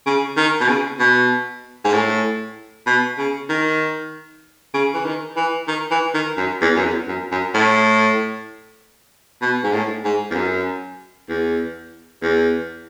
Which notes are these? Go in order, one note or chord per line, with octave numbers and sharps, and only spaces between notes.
C#3
D#3
B2
C#3
B2
G#2
A2
B2
C#3
D#3
C#3
E3
D#3
E3
D#3
E3
D#3
F#2
E2
F#2
E2
F#2
F#2
A2
B2
G#2
A2
G#2
E2
F#2
E2
E2